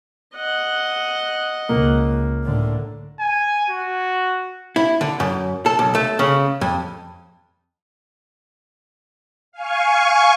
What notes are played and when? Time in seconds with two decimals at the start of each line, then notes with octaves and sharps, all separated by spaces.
0.35 D#5 F#5
1.69 C#2 A#3
2.44 A2 D3
3.20 G#5
3.70 F#4
4.76 E4
5.01 D3
5.20 F#2
5.66 A4
5.79 B1
5.95 A3
6.19 C#3
6.61 F2
9.52 F5 G#5 C#6